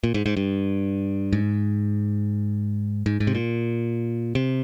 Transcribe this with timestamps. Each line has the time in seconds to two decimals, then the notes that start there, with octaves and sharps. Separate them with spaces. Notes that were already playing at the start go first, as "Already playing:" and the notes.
0.04 A#2
0.14 G#2
0.26 G#2
0.37 G2
1.33 G#2
3.06 G#2
3.20 G#2
3.27 C3
3.35 A#2
4.35 C3